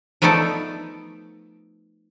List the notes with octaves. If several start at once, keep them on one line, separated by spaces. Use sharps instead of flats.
F3 A3 B3 D#4 A4 D5